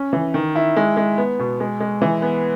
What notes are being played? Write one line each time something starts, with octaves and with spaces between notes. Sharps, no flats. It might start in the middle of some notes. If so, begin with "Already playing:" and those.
Already playing: C#4
E3
D#3
E4
G#3
G#3
B3
B2
G#3
G#3
E3
B3